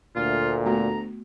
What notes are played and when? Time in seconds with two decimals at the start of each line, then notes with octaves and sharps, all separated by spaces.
0.16 D2 A#2 F4
0.66 A3 B3 F#4 A#5